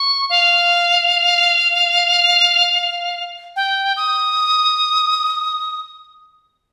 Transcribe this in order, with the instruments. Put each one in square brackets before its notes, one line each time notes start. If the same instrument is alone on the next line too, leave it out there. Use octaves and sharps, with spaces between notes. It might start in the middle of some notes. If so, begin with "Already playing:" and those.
Already playing: [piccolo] C#6
F5
G5
D#6